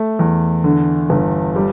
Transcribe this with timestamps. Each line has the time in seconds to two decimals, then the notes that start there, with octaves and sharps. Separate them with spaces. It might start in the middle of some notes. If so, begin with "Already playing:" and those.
Already playing: A3
0.19 E2
0.64 D3
1.10 G1
1.56 G3